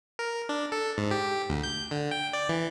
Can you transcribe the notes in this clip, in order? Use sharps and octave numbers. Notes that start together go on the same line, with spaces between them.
A#4
D4
A4
G#2
G4
D2
G6
D3
G5
D5
E3